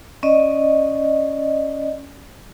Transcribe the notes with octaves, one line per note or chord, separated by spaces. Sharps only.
C#4 D5 D#5